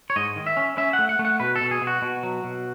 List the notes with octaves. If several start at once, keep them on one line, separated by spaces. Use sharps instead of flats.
C#5
G#2 D#5
D#3
E5
C#4
C#4 E5
F#5
A3
F#5
A3
F#5
B2 B4
A4
B2
G#4
B2
F#4
B2
F#3
B2